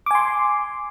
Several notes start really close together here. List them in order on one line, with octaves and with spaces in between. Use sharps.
D6 G#5 C6